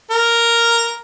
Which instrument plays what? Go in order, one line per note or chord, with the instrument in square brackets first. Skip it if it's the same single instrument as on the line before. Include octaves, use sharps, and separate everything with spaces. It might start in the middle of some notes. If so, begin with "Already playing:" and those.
[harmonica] A#4